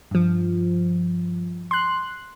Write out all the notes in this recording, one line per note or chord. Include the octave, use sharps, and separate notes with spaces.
G2 F3
C6 F#6